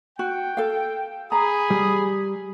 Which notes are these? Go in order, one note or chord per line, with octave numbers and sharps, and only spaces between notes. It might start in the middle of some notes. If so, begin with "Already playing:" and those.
F#4 G5
A4 F5
G#4 A#5 B5 D#6
G3